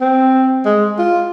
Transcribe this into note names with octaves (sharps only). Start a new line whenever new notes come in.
C4
G#3
F4